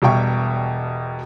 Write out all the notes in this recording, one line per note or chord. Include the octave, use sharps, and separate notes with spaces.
E1 B2 G3 E5 G5 C#6